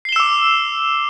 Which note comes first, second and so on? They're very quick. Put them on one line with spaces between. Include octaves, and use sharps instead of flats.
C7 G7 E7 E6 D6